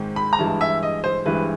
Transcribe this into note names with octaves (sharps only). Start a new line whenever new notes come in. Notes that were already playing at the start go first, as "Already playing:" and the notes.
Already playing: G#2 D#3 G#3 C4
B5
A#5
G2 E3 G#3 A5
E5
D#5
C5
G2 E3 G#3 B4